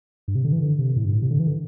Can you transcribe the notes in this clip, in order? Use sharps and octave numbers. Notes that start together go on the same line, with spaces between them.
G2
C3
D3
E3
D3
C3
A2
G2
A2
C3
D3
E3
D3